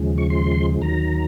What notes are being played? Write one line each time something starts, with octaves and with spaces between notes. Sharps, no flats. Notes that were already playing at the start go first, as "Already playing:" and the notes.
Already playing: D#2 C#3 F3 G#3
C#6
C6
D#2 D#3 F#3 A#5